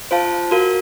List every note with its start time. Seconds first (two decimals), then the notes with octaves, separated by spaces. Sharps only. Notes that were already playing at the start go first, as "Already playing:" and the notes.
0.11 F4 C5 F5 A5
0.51 F#4 A#4 F5